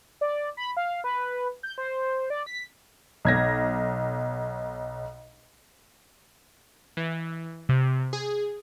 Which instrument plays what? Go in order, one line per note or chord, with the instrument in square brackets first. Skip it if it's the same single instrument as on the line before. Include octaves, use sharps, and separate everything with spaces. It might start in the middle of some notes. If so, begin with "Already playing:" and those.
[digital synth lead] D5
B5
F5
B4
G6
C5
D5
B6
[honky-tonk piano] B1 G#6 A#6
[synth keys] E3
C3
G#4